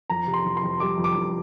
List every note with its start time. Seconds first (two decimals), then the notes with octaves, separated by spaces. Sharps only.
0.10 F2 A#5
0.27 C3
0.34 C6
0.45 F2
0.57 C6
0.63 F2
0.80 G3 D6
0.98 F2
1.04 D6
1.16 F2